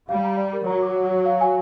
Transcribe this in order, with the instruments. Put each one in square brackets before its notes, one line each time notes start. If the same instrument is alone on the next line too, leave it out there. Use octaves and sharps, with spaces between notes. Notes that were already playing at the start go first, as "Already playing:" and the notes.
[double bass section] G3 [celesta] F5
[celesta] A#5
D5
A#4
[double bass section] F#3 [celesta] A#5
[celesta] D6
F#5
C#5
F5
G#5